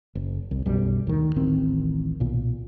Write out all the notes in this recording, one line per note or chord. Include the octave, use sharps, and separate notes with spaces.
F#1
C2
B1 F#2 G3
D2 D#3
D1 A1 D#3 C4
B1 A#2